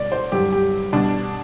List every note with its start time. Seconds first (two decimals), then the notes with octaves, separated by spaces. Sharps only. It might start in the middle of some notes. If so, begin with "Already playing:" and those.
Already playing: B2 G3 D5
0.12 C5
0.32 G2 F#3 G4
0.53 G4
0.93 B2 G3 D4